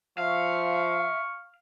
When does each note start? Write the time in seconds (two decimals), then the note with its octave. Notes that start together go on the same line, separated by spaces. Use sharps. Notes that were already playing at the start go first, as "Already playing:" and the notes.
0.18 F3 E5 F5 C#6